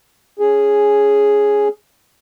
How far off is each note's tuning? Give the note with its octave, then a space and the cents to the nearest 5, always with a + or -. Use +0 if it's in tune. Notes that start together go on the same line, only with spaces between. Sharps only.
C#4 +0 G#4 +0